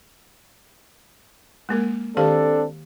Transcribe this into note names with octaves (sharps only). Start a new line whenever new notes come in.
G#3 A#3 A#4
D#3 C4 D4 G4 A4 F5